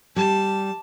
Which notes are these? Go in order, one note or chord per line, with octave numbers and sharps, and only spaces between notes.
G3 A5